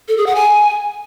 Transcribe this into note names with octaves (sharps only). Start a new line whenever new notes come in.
A4
G#4
F#5
G#5